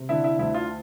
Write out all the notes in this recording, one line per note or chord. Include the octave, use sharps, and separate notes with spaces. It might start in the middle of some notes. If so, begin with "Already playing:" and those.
Already playing: C3
D3 E4
E4
D2 E4
F4